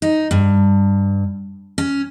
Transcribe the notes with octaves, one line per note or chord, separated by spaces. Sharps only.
D#4
G2
C#4